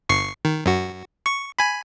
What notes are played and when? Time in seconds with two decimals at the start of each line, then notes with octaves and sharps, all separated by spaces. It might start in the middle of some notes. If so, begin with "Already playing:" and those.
0.09 G1 C#6 C7
0.45 D#3
0.66 F#2 F#4
1.26 C#6
1.59 G#5 B5